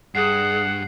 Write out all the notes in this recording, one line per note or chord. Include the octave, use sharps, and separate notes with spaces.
G2 G#4 F#5 C7